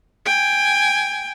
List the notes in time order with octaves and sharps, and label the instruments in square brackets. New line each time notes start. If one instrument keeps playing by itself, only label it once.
[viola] G5 G#5